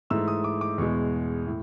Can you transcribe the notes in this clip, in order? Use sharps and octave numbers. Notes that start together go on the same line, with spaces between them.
G#2 E3 A3 E6
D#6
D6
D6
E2 B2 G#3 C#6
A2